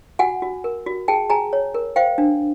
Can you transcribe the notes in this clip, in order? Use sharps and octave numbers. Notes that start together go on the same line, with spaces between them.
F#4 F#5 G#5
F#4
A#4
F#4
G#4 G5 A5
G#4 G#5 A#5
C#5
A#4
C5 F5 G5
D4